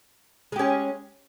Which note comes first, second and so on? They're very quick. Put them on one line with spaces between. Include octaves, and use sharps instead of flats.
G#3 G4 C#4